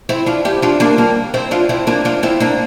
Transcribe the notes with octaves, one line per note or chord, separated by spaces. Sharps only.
C4 E4
D4 F4
E4 G4
D4 F4
A#3 D4
G3 A#3
C4 E4
D4 F4
C4 E4
A#3 D4
D4 F4
C4 E4
A#3 D4